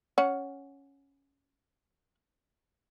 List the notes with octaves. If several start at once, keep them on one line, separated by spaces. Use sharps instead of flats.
C#4 F#5